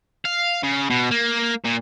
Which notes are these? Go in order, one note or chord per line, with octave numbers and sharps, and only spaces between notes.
F5
C#3
B2
A#3
A#2